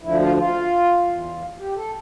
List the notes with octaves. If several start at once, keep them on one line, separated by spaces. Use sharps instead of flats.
D2 D3 F3 E4
F4
F4
E2 E3
G4
A4